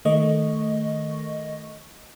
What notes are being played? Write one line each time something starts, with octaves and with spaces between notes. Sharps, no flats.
D#3 A3 D#5 C#6